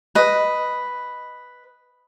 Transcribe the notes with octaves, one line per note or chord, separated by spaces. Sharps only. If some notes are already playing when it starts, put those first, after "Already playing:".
B4 D#5